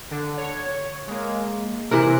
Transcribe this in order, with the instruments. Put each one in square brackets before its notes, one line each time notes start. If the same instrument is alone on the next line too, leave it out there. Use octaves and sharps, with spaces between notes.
[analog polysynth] D3
C#5
G#3 A#3
[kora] C3 E3 A#4 [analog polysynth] C5 F#6